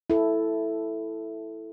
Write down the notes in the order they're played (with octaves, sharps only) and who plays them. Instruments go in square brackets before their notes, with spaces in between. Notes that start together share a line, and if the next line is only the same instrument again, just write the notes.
[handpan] E4 A4